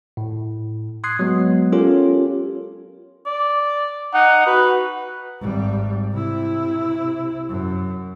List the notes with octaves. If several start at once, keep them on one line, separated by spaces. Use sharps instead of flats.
A2
C6 D#6 F#6 G#6 C7
F#3 G#3 B3
C#4 F4 G4 A4 A#4 C#5
D5
D#4 F#5
F#4 B4
G#1 G3
C3 E4
F#2